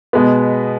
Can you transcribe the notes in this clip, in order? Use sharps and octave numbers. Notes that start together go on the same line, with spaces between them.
B2 G#3 B3